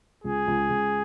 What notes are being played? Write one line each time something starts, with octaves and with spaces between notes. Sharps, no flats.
C#2 G#4
C#2
C#2